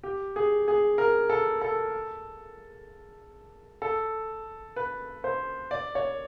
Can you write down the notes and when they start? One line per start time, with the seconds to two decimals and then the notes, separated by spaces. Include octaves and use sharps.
0.03 G4
0.36 G#4
0.68 G#4
0.98 A#4
1.30 A4
1.62 A4
3.82 A4
4.76 B4
5.24 C5
5.71 D5
5.95 C#5